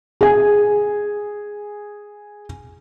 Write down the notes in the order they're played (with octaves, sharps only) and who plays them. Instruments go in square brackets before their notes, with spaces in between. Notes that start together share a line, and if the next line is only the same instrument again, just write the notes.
[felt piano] G#4 G#5